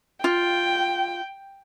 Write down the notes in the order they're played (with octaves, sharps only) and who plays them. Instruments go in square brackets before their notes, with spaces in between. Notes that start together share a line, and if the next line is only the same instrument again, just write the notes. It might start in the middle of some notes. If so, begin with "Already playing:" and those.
[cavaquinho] F4 [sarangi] G5